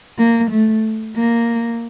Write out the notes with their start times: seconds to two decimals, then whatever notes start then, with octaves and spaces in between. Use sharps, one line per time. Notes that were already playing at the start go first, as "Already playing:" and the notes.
0.18 A#3
0.50 A3
1.16 A#3